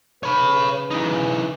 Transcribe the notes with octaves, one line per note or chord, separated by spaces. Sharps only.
C#3 B4 C#5 B5
E3 D#4